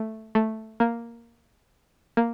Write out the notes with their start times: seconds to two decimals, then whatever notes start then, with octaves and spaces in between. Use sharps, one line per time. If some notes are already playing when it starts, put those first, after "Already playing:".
Already playing: A3
0.35 A3
0.80 A#3
2.17 A#3